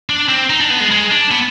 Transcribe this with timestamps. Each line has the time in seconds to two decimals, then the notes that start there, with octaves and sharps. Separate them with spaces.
0.10 D4
0.29 C4
0.50 D#4
0.60 D4
0.70 B3
0.80 G#3
0.91 G#3
1.11 D4
1.31 B3